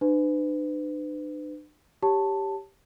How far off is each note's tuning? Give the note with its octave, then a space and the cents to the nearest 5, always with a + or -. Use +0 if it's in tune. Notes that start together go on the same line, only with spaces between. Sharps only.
D4 +45 B4 +35
G4 +0 C#5 +0 A5 +10